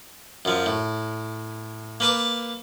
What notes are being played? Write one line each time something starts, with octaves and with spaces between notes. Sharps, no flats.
F#2 F3
A2
A#3 B4 A5 D6